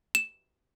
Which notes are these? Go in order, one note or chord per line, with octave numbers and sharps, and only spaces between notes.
E7